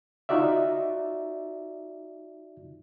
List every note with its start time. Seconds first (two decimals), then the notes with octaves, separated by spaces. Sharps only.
0.29 D#4 F4 F#4 D5 E5